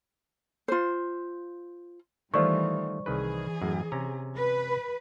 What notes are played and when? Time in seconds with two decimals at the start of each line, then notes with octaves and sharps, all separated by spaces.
0.68 F4 C5
2.34 D#3 E3 G3 A3 F4 C5 D5 C#6
3.06 C2 D#3 E3 G#4 B4
3.62 F#2 A2
3.92 C3 C#4 A#5
4.36 B4